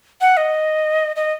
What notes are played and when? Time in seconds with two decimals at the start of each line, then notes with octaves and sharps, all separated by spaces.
0.21 F#5
0.37 D#5
1.16 D#5